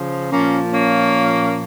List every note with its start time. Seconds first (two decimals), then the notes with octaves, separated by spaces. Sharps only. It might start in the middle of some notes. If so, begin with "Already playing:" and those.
Already playing: C#3 F3
0.31 A#2 F3 A#3 C#4
0.73 A#3 C#4